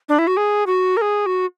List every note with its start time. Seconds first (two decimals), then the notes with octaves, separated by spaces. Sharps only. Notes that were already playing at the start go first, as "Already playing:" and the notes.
0.09 D4
0.19 E4
0.27 F#4
0.37 G#4
0.67 F#4
0.97 A#4
1.01 G#4
1.26 F#4